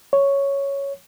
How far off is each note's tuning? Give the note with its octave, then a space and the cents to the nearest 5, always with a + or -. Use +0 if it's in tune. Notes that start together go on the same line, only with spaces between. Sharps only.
C#5 +0